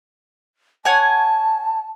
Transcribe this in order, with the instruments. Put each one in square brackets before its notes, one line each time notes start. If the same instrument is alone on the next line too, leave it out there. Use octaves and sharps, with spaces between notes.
[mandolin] C#5 F#5 G#5 [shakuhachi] A5